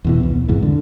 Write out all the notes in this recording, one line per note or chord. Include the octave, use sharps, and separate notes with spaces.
E2 B2 E3
C2 B2
D#2
E2 G#2 C3 E3
D3